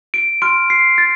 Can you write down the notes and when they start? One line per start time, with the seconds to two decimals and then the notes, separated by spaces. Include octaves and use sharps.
0.14 D7
0.42 C6 F6 D7
0.70 C7
0.98 A6